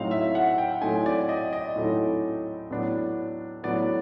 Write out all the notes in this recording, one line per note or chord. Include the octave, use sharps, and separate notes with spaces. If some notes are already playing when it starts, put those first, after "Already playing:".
Already playing: A2 F#3 A3 C4 D#4 F5
E5
F#5
G5
A2 F#3 A3 C4 D#4 G#5
D5
D#5
D#5
A2 F#3 A3 C4 D#4
A2 F#3 B3 D4
A2 F#3 B3 D4 D5